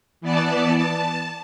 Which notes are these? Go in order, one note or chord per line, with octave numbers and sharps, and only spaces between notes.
E3 B3 D5 A5
A5